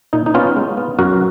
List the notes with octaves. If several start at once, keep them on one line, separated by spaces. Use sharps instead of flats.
A#2 D#4
D#4
B3 C#4 F4
G#3
B3
F#2 F#4 A#4